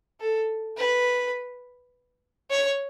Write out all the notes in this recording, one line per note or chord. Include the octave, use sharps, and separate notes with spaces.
A4
B4
C#5